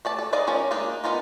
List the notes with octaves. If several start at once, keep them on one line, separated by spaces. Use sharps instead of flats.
A3 D5 A5
A4
D#4 G#4 D5 D#5 F5
F3 C#4 D#4 A#4
G#3 A#3 D4 D#4
B3 D#4 F4 A#4